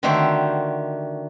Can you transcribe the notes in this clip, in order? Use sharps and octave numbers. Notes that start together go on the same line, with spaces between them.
D3 D#3 A3 F#4 G4 C5